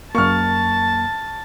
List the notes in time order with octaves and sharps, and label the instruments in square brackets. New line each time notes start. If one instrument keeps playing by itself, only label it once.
[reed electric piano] F#2 A#3 [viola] A5 [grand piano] C#6 F6